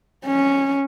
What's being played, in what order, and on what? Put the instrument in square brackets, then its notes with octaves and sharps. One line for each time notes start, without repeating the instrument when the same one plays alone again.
[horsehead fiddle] C#4